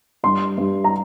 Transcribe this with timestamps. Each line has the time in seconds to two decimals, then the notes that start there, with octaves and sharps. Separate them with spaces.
0.23 G2 C6
0.57 G2
0.84 A#5